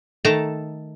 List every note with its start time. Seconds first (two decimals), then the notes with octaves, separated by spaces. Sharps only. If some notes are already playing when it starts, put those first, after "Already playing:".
0.25 D#3 A3 A4 A5 A#5